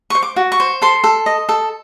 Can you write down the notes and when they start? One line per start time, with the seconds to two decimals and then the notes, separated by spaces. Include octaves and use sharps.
0.10 C5 C#6
0.23 D6
0.36 F#4
0.52 C#6
0.60 C5
0.82 A4 C6
1.04 A4
1.26 D#5
1.49 A4